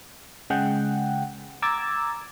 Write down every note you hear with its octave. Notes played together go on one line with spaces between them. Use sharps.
C#3 G#3 G#4 F#5 G5
A#5 D6 E6 G#6 A6